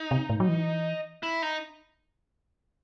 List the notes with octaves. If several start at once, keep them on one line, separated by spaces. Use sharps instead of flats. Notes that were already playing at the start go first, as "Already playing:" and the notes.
Already playing: D#4
C3
A2
F#3
E3
E4
D#4